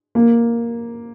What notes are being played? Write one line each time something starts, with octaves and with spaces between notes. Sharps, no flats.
A#3